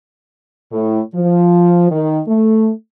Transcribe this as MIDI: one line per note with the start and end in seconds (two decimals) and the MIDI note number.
0.72 1.00 45
1.15 1.90 53
1.91 2.21 51
2.28 2.72 57